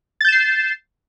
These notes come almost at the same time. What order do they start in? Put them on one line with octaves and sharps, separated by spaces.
A6 G6 E7 C7